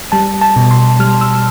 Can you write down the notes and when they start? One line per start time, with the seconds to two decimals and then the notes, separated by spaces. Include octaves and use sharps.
0.12 G3 A5
0.41 A5
0.56 B2
0.71 C6
0.99 G3 F6
1.21 E6